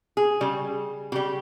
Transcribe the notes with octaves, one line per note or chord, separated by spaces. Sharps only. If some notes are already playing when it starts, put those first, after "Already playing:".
G#4
C#3 G3
C#3 G3 G4